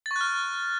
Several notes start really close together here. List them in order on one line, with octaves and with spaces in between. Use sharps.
A6 C#6 F#6 F6